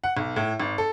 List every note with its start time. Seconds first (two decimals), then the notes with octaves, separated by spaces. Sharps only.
0.04 F#5
0.17 B1
0.36 A2
0.60 G#1
0.78 A4